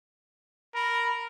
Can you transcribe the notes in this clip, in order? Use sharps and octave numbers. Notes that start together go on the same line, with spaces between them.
A#4 B5